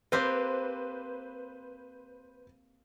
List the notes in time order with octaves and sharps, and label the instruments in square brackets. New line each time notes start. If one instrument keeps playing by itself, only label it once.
[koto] A#3 C4 G4 [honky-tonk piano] B4 C5